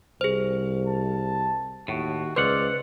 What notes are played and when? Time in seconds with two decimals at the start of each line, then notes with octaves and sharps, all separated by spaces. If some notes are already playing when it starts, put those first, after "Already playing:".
0.21 C2 G#4 C5
0.87 A5
1.88 D#2 A2 F#4
2.36 C#2 B4 C5 D5 F5 F#5